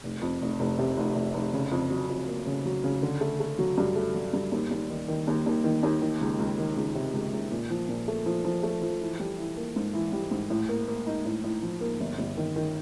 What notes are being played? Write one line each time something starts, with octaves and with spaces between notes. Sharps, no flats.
F1
F2
F1
F1
C3
F1
F1
F1
C#3
F2
F#3
F2
A#3
C#3
F#3
C#3
D3
A3
A3
F#3
G2
A3
F#3
G2
D#2
D#2
D#3
D#3
D#2
D#2
D#3
D#2
D#3
C#2
C#2
D#3
C#2
C3
C#2
C#2
A#2
F3
A#2
A3
F3
F3
A3
F3
E3
G3
E3
A#3
G#2
E3
G3
G#2
A2
A#3
A#3
D#4
A2
A2
F3
A#3
G1
G1
D#3
D#3